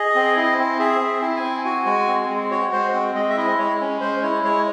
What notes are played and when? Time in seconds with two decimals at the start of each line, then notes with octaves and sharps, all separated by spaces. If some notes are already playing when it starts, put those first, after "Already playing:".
Already playing: G#4 D#5
0.15 C4
0.37 E4
0.58 C4
0.79 G#4 E5
1.00 C4
1.07 E5
1.22 E4
1.36 G#5
1.43 C4
1.65 F#4 G#5
1.86 G#3
2.07 C4
2.29 G#3
2.51 F#4 C#5
2.72 G#3 C5
2.94 C4
3.15 G#3 D#5
3.30 E5
3.37 E4 D#5
3.58 G#3 C#5
3.80 C#4
4.01 G#3 C5
4.23 E4 C#5
4.44 G#3 C#5